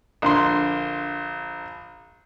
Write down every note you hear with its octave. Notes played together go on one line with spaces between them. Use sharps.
A#1 D3 C6